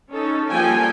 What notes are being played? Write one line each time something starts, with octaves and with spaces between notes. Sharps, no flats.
C#4 D#4 A4
F3 G3 A#3 A4 G5 G#5